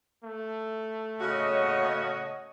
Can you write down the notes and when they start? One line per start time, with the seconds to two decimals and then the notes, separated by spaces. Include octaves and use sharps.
0.24 A3
1.21 C#3 F#4 C#5 D#5